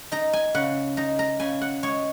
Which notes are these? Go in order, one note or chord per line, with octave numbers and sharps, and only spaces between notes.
D#4 A#5
G#5
C#3 F#5
D#4 A#5
A#5
C#3 G#5
F#5
G#3 C#5